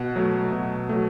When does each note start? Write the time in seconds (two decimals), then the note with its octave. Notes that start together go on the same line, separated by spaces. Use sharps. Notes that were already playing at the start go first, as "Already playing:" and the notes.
Already playing: B2 F#5
0.16 F#3 A3
0.52 B2
0.89 F#3 A3